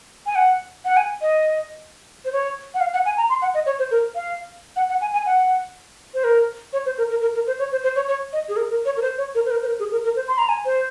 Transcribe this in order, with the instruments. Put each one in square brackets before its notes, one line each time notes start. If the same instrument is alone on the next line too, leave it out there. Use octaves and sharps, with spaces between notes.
[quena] G#5
F#5
F#5
G#5
D#5
C5
C#5
F#5
F5
F#5
G#5
A#5
C6
F#5
D#5
C#5
C5
A#4
F5
F#5
F#5
G#5
G#5
F#5
C5
A#4
C#5
C5
A#4
A#4
A#4
A#4
C5
C#5
C5
C5
C#5
C#5
D#5
G#4
A#4
A#4
C#5
A#4
C5
C#5
A#4
C5
A#4
C5
A#4
G#4
A#4
A#4
C5
C6
A#5
G#5
C5